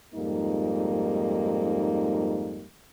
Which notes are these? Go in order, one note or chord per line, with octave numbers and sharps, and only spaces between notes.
F2 G#2 G3 A#3 D#4